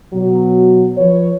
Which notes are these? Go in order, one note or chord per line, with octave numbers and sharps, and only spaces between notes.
B2 F#3
F3 B4 C#5